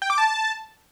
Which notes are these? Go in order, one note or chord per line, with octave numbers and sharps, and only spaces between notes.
G5
D6
A5